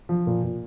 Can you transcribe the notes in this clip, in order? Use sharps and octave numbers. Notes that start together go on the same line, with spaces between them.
F3
A#2
A#2